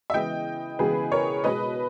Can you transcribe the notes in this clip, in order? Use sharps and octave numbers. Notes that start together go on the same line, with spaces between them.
E5
C#3 E3 G#3 B3 D#5 G5
C#3 E3 G#3 B3 G#4 B4
A#4 C#5
B2 G#3 B3 B4 D#5